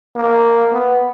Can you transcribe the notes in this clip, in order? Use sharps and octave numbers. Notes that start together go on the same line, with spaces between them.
A#3
B3